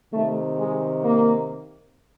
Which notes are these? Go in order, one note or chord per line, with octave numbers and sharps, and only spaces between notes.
C3 D#3 A3
G#3
A#3